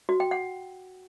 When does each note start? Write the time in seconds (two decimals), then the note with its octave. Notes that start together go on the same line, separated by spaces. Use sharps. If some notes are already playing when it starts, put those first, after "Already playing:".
0.09 F#4
0.20 G5
0.31 F#5